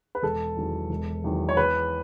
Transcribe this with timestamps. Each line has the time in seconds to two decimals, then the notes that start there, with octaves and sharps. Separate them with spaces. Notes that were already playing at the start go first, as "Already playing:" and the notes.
0.15 B4
0.22 E1 A4
0.57 E2 D#3 F#3
0.89 E1
1.24 E2 D#3 F#3
1.49 C#5
1.57 E2 B4